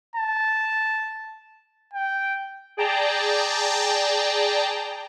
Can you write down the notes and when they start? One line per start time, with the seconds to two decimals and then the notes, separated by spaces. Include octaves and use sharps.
0.16 A5
1.94 G5
2.77 G#4 D5 G5 A5 A#5